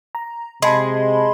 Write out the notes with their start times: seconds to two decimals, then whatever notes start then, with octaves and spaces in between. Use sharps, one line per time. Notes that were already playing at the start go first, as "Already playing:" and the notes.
0.15 A#5
0.62 C3 G#3 A5 B5 C6